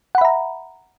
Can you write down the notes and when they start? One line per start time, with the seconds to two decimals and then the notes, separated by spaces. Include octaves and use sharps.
0.15 F#5
0.18 B5
0.21 E5
0.25 A#5